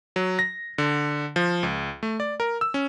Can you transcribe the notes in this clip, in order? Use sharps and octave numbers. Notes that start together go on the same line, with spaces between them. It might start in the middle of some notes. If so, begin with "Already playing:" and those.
F#3
A#6
D3
F3
C#2
A3
D5
A#4
E6
C#4